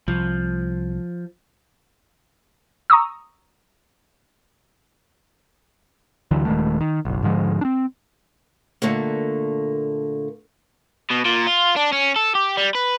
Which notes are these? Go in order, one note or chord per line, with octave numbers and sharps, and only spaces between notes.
C2 F3
A#5 C#6 D#6 E6
D2 D3 E3 F#3
D#1 D#3 G#3 A3
D#3
F#1 B1
G#2 D3 F3 G#3
C4 D4
A#2 D3 A3 A#3
B2
A#2
F4
D4
C#4
A4
G4
G3
B4